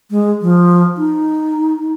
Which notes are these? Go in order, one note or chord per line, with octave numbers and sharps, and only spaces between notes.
G#3
F3
D#4